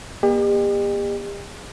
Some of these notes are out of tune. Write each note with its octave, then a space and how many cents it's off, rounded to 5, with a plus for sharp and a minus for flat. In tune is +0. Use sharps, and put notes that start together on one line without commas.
A#3 +40 G4 +40 D#5 -45